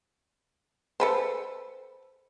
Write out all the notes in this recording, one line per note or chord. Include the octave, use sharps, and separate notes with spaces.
A4 B4 C5